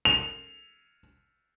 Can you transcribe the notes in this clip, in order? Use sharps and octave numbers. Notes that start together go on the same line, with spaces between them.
F7